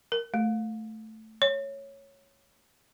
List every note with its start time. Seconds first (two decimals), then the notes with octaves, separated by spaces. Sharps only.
0.12 A#4
0.34 A3
1.42 C#5